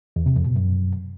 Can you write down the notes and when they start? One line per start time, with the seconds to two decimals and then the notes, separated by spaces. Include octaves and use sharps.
0.16 E2
0.26 C3
0.36 F2
0.46 B2
0.56 F#2